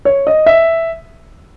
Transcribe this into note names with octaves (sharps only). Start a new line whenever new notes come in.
C#5
D#5
E5